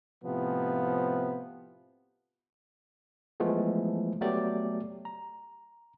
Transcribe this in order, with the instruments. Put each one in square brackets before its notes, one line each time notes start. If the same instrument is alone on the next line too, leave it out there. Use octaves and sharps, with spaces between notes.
[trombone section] A2 C3 F3 B3
[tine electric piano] E3 F3 G#3 A3 B3
F#3 A3 B3 G4 D5
A#5